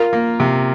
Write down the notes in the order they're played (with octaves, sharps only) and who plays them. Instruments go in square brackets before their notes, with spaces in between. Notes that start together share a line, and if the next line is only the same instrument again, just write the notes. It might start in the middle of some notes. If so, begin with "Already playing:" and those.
Already playing: [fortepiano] F4 [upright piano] A#4
[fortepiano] A#3
C3